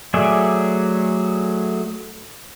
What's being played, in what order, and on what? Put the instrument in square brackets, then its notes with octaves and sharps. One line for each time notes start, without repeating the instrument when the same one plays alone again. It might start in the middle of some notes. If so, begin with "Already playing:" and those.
[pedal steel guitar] F#3 A3 G#4 D5 E5